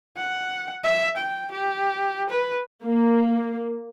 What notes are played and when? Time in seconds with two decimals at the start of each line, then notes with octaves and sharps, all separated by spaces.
0.17 F#5
0.84 E5
1.17 G5
1.52 G4
2.30 B4
2.82 A#3